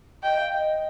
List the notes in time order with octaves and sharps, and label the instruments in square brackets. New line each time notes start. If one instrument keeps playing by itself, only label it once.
[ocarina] D#5 [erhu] G5
[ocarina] F5
D#5